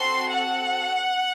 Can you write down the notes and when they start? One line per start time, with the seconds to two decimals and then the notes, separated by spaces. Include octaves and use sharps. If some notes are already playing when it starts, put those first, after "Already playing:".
Already playing: C4 F#4 A4 C6
0.34 F#5